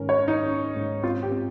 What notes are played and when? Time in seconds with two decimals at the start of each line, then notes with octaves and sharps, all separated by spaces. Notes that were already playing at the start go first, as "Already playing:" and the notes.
Already playing: G#2 D#3 C#4 A#4
0.09 C#5
0.18 C#4
0.28 D#4
0.46 C#4
0.76 G#2
1.03 C4 F4
1.23 G4
1.31 C4